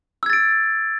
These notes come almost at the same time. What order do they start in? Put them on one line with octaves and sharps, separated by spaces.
E6 G#6 A6 D7